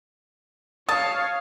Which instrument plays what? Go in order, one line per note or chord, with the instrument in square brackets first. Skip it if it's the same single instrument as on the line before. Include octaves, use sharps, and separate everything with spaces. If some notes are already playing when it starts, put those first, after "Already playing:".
[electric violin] C#5 F5 [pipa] A5 [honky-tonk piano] D#6